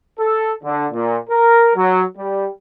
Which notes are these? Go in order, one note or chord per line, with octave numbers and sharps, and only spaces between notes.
A4
D3
A#2
A#4
F#3
G3